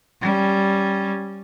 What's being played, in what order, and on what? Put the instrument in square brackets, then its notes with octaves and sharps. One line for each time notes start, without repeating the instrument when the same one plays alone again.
[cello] G3 C#4